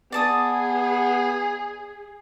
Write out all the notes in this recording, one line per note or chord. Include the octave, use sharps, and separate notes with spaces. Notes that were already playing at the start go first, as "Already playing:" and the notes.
B3 G#4 D5 A5 D#6